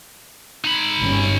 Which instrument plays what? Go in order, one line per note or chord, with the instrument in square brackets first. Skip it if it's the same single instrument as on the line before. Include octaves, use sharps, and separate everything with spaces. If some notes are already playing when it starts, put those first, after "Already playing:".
[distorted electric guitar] D#4 B5
[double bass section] G1 G3 C#4